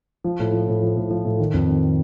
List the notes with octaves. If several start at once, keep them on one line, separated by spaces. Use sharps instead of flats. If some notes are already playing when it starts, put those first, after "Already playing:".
F3
A2
F3
A2
F3
A2
F3
A2
D#3
F2
D#3